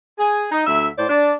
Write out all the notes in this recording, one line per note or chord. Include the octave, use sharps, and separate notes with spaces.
G#4
D#4
D2 E5
A2 C5 D5
D4